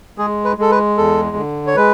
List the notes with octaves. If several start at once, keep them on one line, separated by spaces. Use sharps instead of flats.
G#3 G#4
B4
G#3 A4
B4
E2 A4
D3
C#5
G#3 B4